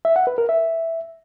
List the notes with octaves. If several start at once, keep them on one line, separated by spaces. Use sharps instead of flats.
E5
F#5
B4
A#4
E5